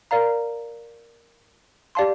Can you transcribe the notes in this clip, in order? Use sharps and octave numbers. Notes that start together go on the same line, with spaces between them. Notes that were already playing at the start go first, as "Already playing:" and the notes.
A#4 D5 F5 A#5
G4 D5 F5 A5 C6